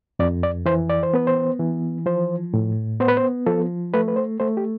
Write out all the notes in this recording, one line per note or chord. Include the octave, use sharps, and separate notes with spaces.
F2 D5
D5
E3 C5
D5
C5
B3 B4
C5
E3
F3 C5
A2
B3 C5
B4
C5
F3 A4
A3 B4
B4
C5
A3 C5
G4